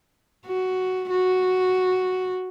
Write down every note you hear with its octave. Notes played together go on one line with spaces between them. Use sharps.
F#4
F#4